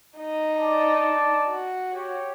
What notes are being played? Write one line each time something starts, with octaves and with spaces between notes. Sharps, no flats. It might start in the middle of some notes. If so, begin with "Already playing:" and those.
D#4
D4 D5 A5
F#4
G4 C#5